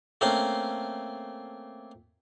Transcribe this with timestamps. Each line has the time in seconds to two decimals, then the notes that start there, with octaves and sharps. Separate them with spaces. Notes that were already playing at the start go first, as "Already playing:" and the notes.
0.21 A3 A#3 C4 C#4 F5